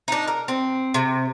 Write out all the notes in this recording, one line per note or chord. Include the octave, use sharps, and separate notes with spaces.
D4 D#4
A#4
C4
C3